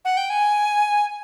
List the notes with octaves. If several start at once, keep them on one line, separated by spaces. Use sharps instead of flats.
F#5
G5
G#5